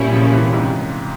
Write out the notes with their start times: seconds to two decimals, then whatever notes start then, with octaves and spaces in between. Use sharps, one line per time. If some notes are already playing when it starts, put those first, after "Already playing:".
Already playing: A#2 G3 C#4 E4
0.13 C#3 F3
0.33 C3 E3
0.53 G#2 C3